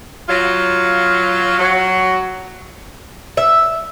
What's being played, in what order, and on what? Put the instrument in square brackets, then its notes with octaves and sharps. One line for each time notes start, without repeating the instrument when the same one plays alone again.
[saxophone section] F#3 F4
F#3
[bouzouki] E5